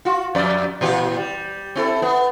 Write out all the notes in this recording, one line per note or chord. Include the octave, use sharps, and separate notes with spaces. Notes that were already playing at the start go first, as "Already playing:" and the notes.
F4 F#4
F2 D5
A#2 E3 G4
G3
C4 E4 A4
B3